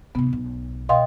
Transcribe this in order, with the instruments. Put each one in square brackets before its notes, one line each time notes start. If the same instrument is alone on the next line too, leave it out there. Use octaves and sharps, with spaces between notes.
[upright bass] B1 C3 [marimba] B3
[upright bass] B1
[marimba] B2 F5 C6 [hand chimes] D#5 G5